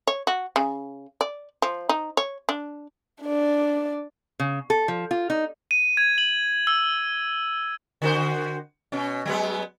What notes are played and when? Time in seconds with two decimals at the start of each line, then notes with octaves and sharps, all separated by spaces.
0.07 C#5
0.27 F#4
0.56 C#3
1.21 D5
1.62 F3
1.89 D#4
2.17 C#5
2.49 D4
3.22 D4 D5
4.40 C#3
4.70 A4
4.88 F3
5.11 F4
5.30 D#4
5.71 D#7
5.97 G#6
6.18 F#7
6.67 E6
8.02 D3 F#4 C5
8.92 B2 C#4
9.25 F#3 G#3 B3